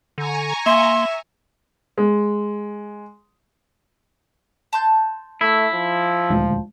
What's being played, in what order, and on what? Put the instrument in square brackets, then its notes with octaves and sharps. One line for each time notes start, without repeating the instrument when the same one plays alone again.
[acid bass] D3 [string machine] G#5 A#5 C#6
[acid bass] A#3 [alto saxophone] E5 [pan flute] C6
[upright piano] G#3
[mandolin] A5 C6 G6
[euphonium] A3 [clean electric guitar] E4
[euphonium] F3
[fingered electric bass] D#1 D2 G#3